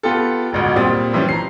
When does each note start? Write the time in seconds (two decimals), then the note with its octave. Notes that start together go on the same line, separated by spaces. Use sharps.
0.03 B3 F4 G4 A4
0.52 E1 A1 D2
0.76 A#2 G3 C4 D#6 A6
1.13 E3 F3 G3 C#4
1.29 A#5 C7